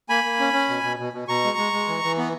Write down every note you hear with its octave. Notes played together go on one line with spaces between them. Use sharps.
A#3 G#5 B5
A#3
C#4
C#4
B2
B2
B2
B2
B2 A#5 C#6
G#3
G#3
G#3
E3
E3
B3